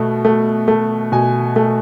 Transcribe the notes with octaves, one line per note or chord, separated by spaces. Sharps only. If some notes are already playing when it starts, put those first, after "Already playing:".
Already playing: B2 A3
A3
A3
B2 G#5
A3